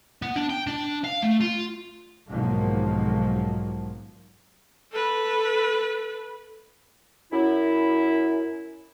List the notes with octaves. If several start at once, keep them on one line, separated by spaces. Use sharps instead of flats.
B3
D4
G5
D4
F5
A3
F4
B1 G#2 D#3 F3 F#3 A#3
A4 B4
F#2 E4